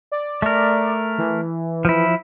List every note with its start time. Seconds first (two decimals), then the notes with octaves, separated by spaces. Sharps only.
0.12 D5
0.42 A3 A#4
1.18 E3
1.85 F3 E4